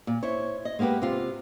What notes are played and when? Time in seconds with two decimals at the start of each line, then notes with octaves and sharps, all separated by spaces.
0.07 A#2
0.23 E4 C5 C#5
0.65 D#5
0.79 G#3 A#3 B3 G4 B4
1.02 C3 F4